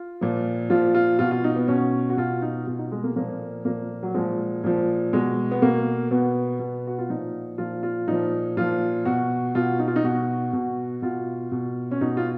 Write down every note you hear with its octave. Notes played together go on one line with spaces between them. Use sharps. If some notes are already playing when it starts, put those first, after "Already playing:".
Already playing: F4
A#2 F3
A#2 F3 F4
F4
B2 F4
F4
D#4
B3
B2 C#4
F#4
B2 F4
D#4
B2 F4
D#4
G#3
A#3
A#2 F3 A#3
A#2 F3 A#3
F#3
A#2 F3 G#3
A#2 F3
B2 G#3
B3
B2 A#3
B2 B3
B2
F#4
F4
A#2 F3 D#4
A#2 F3 F4
F4
A#2 F3 D#4
A#2 F3 F4
B2 F#4
B2 F4
D#4
F4
D#4
B2 F#4
B2
B2 F4
B2
C#4
B2 D#4
F4